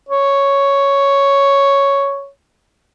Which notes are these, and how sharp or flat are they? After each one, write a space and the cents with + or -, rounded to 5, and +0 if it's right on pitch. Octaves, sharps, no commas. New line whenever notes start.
C#5 +0